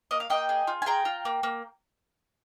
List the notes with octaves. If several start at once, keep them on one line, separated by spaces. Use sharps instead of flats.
A#3 D#5
F5
A#3 D#5 G5
G#4
F4
G#5
G#4 G5 A#5
F4
A#3
A#3